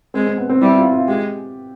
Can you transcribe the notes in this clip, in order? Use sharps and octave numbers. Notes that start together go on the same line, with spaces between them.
G#3 C4
C4
B3
C4
G3 E4
F4
F4
G#3 G4